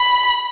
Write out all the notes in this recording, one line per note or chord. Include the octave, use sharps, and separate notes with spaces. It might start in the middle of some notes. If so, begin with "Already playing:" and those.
Already playing: B5